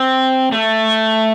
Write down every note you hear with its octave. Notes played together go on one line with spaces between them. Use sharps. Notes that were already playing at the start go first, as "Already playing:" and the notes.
Already playing: C4
A3